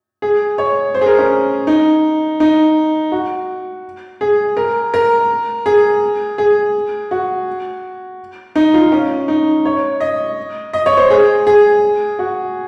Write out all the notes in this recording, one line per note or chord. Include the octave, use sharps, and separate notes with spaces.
G#4
C#5
C5
G#4
A#4
C#4
D#4
D#4
F#4
G#4
A#4
A#4
G#4
G#4
F#4
D#4
F4
C#4
D#4
C#5
D#5
D#5
C#5
C5
G#4
G#4
F#4